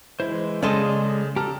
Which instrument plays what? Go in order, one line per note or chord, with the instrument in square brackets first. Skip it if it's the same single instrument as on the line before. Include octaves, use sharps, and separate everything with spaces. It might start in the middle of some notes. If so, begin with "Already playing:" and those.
[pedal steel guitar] E3 G#3 C5 [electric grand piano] E4
[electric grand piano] C#3 [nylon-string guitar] G#3 A4 D#5 [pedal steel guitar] D5 C6 D#6
[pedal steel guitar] G4 A4 [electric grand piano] A5 A#5 F6